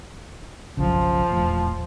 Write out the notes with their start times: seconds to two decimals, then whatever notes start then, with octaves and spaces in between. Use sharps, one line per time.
0.77 F#1 B1 C#3 F3
1.30 D#1 E2 A2